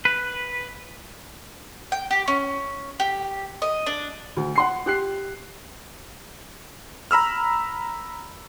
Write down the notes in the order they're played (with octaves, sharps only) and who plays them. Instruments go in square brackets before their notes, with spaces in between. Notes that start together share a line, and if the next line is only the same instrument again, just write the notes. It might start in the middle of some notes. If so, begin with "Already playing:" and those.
[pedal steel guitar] B4
[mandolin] G5
G4
C#4
G4
D#5
D4
[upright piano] D2
F#5 C6 C7
G4 F#6 C7
[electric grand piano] A#5 B5 E6 F6